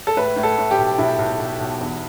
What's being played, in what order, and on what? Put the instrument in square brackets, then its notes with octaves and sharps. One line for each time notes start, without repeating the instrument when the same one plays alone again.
[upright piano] A4
A2 B4
A2
A4
A2
G4
B1
B1 E4
B1
B1
B1
E2